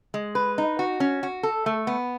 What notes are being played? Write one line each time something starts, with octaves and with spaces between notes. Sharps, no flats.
G#3
B4
D#4
F#4
C#4
F#4
A4
A3
B3